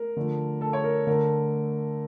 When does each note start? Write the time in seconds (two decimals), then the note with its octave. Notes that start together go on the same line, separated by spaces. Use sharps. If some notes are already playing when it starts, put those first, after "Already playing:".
Already playing: A#4
0.17 D3 F3 A3
0.61 A4
0.73 C#5
0.84 A#4
1.07 D3 A3 A#4